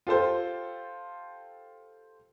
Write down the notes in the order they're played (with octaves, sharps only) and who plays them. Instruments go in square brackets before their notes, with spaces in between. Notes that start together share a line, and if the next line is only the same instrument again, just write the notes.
[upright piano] F4 G4 A4 C5